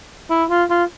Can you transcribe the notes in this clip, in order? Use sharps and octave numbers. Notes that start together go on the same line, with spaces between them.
E4
F4
F4